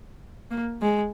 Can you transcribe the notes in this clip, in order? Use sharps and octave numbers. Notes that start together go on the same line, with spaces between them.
A#3
G#3